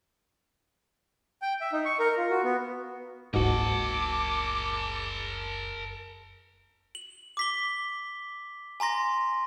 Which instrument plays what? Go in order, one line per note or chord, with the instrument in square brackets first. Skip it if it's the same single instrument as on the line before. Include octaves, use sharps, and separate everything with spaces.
[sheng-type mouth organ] G5
E5
D#4
C#6
A#4
F4
F#4
B3
[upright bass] F#1 C#2 [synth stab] G#2 F#4 [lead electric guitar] A#4 A5 [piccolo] D6
[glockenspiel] F#7
D6 B6 G7
G#5 A#5 C6 A#6